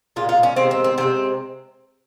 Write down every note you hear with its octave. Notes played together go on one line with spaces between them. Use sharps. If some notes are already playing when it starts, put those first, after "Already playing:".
A#2 G#3 F4
F4
C#4
C3 D#3 G#3 C4
C4
C4
C3 F3 G#3 C4